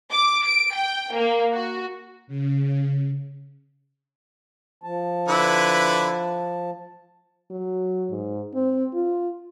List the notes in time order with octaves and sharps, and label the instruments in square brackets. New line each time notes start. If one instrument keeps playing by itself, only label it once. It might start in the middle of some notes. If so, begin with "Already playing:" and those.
[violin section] D6
D7
G5
A#3
F#4
[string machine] C#3
[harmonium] F3 A5
[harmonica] D3 E4 B4
[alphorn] F#3
G#2
C4
F4